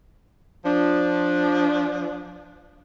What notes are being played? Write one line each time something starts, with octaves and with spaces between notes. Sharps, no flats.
F3 D4